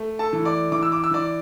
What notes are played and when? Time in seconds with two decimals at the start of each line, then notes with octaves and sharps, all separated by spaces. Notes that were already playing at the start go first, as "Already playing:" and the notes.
Already playing: A3
0.19 A4 A5
0.33 E3
0.45 D5 D6
0.72 E3 D6
0.82 E6
0.92 D6
1.04 E6
1.11 E3 D5 D6